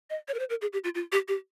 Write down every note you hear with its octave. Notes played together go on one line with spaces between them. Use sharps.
D#5
C#5
A#4
C5
A#4
G#4
G4
F4
F4
G4
G4